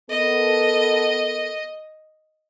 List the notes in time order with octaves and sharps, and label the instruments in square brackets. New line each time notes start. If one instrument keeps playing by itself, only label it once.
[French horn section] B3 A4 A#4 [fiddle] D#5